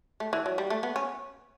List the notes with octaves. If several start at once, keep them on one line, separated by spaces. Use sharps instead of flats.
A3
E3
F#3
G3
A3
B3
C#4